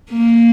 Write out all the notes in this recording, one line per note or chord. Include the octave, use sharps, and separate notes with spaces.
A#3